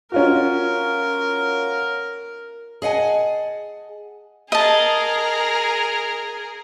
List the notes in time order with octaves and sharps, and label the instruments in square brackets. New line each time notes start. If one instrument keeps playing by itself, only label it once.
[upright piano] C#4 F4 F#4 [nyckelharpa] A#4
[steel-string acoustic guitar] G#4 D#5 F#5 G#5 A5
[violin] G#4 A#4 [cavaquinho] D#5 A5